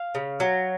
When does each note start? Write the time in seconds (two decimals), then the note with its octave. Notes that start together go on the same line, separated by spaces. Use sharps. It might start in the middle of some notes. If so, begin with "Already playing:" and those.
Already playing: F5
0.15 C#3
0.40 F#3